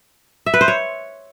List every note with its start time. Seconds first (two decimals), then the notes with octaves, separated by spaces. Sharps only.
0.46 E5
0.54 B4
0.61 C5
0.68 C#5